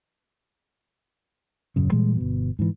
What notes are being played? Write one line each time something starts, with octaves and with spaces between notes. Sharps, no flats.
D#1 F#2 C#3
A#2 E3 G3 G#3
G1 B2
G#2 E3